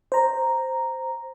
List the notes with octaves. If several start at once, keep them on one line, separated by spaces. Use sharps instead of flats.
C5 A#5